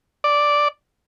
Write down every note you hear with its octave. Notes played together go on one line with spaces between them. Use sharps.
D5